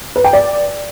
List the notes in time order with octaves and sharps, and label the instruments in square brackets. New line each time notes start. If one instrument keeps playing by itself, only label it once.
[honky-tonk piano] B4
G5
D5